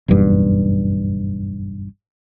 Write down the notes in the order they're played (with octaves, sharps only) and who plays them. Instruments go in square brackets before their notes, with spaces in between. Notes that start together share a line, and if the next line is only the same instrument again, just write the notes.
[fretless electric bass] F#1 B1 E2 G2